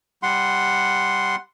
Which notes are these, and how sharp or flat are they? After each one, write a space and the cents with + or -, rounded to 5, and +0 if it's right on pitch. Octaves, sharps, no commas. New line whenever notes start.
G3 +0 F#5 +0 C6 +0